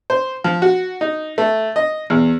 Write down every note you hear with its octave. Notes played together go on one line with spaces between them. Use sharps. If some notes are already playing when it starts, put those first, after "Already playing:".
C5
F3
F#4
D#4
A3
D#5
E2